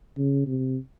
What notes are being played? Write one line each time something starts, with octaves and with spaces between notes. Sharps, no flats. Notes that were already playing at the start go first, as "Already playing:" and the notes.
C#3
C3